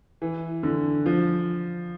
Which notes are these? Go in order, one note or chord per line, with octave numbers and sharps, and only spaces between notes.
E3
D3
F3